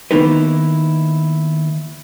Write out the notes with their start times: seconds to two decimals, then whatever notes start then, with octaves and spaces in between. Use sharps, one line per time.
0.11 D#3 A#3 B3 D#4 E4 B4